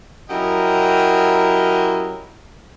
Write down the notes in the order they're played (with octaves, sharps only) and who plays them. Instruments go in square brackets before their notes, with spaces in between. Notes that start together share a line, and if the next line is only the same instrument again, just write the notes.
[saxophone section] F#3 C#4 E4 G4 A#4 D#5